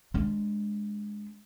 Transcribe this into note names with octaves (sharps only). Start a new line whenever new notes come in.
G#3 D4